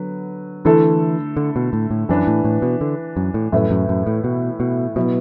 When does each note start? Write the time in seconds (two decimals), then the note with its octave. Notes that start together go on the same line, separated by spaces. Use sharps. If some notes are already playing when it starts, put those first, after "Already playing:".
Already playing: D3 F#3 B3 B4
0.65 D3 E3 A3 E4 A4
1.37 D3
1.56 B2
1.73 A2
1.91 A2
2.09 F#2 E3 D4 B4
2.27 A2
2.44 A2
2.62 B2
2.81 D3
3.17 F#2
3.34 A2
3.52 F#2 A2 E3 A3 E4 B4
3.71 F#2
3.89 F#2
4.07 A2
4.24 B2
4.60 B2
4.96 B2 F#3 B3 E4